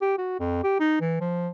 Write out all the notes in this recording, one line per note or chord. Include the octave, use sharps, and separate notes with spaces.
G4
F#4
F2
G4
D#4
E3
F3